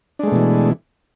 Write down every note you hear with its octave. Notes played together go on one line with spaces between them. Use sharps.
B2 E3 G#3 A3 D4